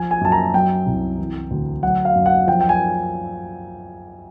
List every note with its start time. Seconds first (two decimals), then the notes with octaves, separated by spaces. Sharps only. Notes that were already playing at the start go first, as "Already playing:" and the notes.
Already playing: F3 G#5
0.11 G#5
0.21 F#2 A5
0.32 A#5
0.54 F#3 G5
0.86 C2
1.19 E3
1.51 D2
1.83 F#3 F#5
2.05 F5
2.15 F#2
2.26 F#5
2.47 F3 G5
2.61 G5
2.69 G#5